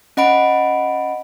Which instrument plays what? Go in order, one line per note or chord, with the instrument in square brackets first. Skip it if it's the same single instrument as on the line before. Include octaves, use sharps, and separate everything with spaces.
[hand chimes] C#4 D#5 F#5 B5 D7